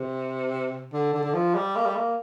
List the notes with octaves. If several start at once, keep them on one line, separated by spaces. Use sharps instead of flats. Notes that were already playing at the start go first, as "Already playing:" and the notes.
Already playing: C3
D3
D3
D3
F3
G3
A#3
G3
A#3